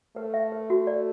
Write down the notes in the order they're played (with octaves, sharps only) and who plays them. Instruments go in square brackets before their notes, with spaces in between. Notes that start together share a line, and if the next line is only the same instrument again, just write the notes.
[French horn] A3 [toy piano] B4
[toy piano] E5
B4
F#4
D5